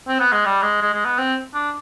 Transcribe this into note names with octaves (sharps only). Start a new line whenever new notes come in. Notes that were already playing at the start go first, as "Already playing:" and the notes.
C4
B3
G#3
G3
G#3
G#3
G#3
B3
C4
D4